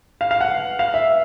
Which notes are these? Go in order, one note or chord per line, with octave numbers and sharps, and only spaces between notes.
F5
F5
F#5
F5
E5